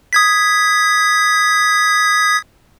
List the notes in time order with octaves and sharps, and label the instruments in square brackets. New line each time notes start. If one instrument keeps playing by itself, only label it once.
[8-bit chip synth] D#6 G#6 B6